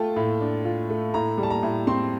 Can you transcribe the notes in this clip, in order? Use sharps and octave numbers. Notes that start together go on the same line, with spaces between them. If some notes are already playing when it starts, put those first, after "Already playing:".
Already playing: A3 F4 G5 A5
A2
D4
F4
A3
A2 A#5
G3
A5
A#5
A2
C4 C6